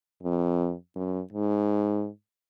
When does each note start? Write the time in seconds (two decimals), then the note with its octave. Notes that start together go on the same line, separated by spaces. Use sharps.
0.23 F2
0.96 F#2
1.32 G#2